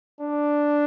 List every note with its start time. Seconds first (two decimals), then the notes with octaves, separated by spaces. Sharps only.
0.20 D4